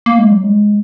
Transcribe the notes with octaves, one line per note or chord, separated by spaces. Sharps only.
A#3
G#3
F#3
G#3